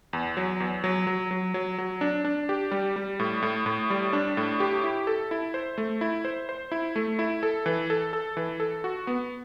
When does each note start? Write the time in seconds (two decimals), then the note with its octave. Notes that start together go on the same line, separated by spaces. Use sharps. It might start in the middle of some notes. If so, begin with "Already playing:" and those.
0.13 E2
0.37 F#3
0.60 E2
0.84 F#3
1.07 F#3
1.31 F#3
1.54 F#3
1.78 F#3
2.01 D4
2.25 D4
2.49 G4
2.71 G3
2.96 G3
3.19 A2
3.42 A2
3.66 A2
3.90 G3
4.13 D4
4.37 A2
4.60 G4
4.84 E4
5.07 A4
5.31 E4
5.54 C5
5.78 A3
6.01 E4
6.25 C5
6.49 C5
6.72 E4
6.96 A3
7.19 E4
7.43 A4
7.66 E3
7.90 A4
8.13 A4
8.37 E3
8.60 A4
8.84 F#4
9.07 B3